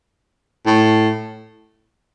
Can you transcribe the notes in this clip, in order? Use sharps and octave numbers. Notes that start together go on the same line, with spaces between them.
A2